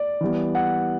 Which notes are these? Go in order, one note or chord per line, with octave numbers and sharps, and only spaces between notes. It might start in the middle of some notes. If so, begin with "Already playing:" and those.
Already playing: D5
E3 G3 B3
F#5